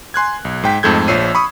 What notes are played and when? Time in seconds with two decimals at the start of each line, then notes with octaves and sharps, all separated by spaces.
0.14 G#5 C6 F#6 G#6
0.45 B1
0.63 G#2 G5 B6
0.83 F2 G#2 A3 A4 G6 G#6
1.08 A#1 F3 C#5 E6 C7 D#7
1.35 B5 C#6 D#6